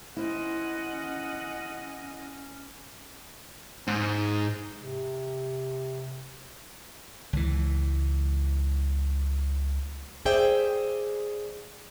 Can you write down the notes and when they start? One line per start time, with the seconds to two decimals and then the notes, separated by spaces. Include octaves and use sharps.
0.17 C#4 E4 C5 D#5 F#5
3.87 G#2
4.78 C3
7.33 C#2 E3
10.25 G#4 C5 D5 E5 G5